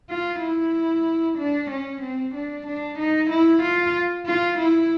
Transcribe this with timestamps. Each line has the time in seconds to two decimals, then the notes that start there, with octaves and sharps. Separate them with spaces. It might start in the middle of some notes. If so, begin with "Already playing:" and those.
0.10 F4
0.42 E4
1.38 D4
1.71 C#4
2.02 C4
2.35 D4
2.67 D4
2.99 D#4
3.30 E4
3.63 F4
4.27 F4
4.59 E4